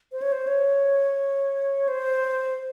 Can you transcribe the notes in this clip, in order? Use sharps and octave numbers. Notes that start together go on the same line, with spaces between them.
C5
C#5
C5
C#5
C5